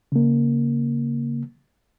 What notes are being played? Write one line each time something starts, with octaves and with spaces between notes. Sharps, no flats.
C#3 A#3